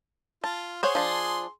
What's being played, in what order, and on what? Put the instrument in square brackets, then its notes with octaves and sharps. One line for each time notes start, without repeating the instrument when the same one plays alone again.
[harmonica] F4 [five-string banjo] A5
[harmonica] G#4 C6 [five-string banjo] C5 C#5 F#5
[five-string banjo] F3 D4